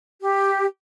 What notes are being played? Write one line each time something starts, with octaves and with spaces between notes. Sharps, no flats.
G4